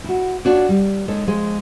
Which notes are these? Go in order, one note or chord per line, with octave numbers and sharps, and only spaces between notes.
E4 F#4
D4 F4 F#4 C#5 D5
G3
G#3 D#4 A4 C#5
F3 G#3 G#4